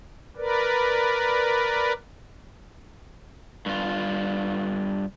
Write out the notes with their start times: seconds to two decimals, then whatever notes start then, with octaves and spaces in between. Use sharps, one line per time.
0.37 A#4 B4 D5
3.66 G2 F4